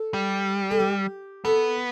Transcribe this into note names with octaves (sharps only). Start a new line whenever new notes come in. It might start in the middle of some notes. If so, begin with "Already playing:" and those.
Already playing: A4
G3
A4
G4
B3 A4